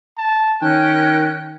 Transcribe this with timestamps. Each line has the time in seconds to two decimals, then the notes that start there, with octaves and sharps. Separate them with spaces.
0.17 A5
0.62 D#3 C#4 A#4 G5 F#6